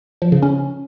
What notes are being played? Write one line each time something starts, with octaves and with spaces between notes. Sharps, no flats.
F3
C#3
C#4